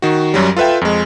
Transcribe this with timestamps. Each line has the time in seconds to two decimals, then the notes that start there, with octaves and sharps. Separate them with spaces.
0.02 D#3 F#4
0.34 F#2 F#3 G3
0.57 F4 A4 B4 E5 G5
0.81 F2 G#3